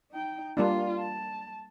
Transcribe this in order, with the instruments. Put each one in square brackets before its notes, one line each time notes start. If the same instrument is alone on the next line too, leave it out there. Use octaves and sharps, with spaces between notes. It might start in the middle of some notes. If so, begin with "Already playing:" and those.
[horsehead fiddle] D#4 G5
[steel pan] G3 A#3 D4 [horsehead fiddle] F4
[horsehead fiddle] A5